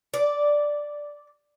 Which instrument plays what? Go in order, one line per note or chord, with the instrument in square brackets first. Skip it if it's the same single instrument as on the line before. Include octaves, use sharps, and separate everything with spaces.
[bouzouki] D5